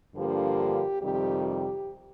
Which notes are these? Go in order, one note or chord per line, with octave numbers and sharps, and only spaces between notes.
G2 D3 F3 A#3 G4
F2 C3 D#3 G3 G4
G4